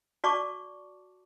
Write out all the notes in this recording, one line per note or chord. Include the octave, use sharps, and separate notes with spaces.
F#4 D5 A5 C#6 D6